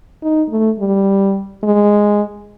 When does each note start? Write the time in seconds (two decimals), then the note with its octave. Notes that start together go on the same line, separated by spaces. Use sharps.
0.23 D#4
0.50 A3
0.79 G3
1.64 G#3